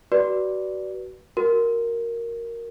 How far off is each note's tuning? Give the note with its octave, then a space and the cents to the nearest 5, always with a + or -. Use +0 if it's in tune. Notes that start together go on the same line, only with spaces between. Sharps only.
F#4 +30 B4 -15 D5 -5
F#4 +0 A#4 +0